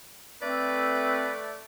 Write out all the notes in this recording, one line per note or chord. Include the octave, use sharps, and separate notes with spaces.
A3 C4 B4 D5